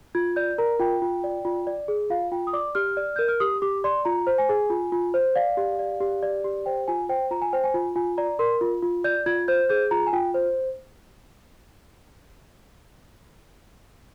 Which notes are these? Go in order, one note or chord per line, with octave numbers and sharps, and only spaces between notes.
F4 G#6
D5 G6
A#4 A#5
F4 G5
F4
D5
F4
D5
G#4
F4 F5
F4 G5
D#6
D5 D6
G4 F6
D5
A#4 G6
F6
G4 D#6
G4 D6
D5 C6
F4 A#5
C5
G#5
G#4
F4
F4
C5
D5 F5
G4
D5
G4
D5
G4
C5 G5
F4 G#5
C5 G5
F4 A#5
G#5
C5 G5
G#5
F4
F4 G#5
D5 A#5
A#4 C6
F4
F4
D5 G6
F4 G#6
C5 G6
G#4 G6
F4 A#5
G#5
F4 G5
C5